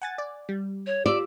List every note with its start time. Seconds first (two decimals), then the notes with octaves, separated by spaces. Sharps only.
0.02 F#5 G#5 A6
0.18 D5
0.49 G3
0.86 C#5
1.06 F4 G4 D5 E6